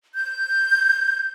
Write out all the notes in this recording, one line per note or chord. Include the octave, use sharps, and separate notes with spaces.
G6